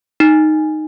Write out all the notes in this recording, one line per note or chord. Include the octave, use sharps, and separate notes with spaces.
D#4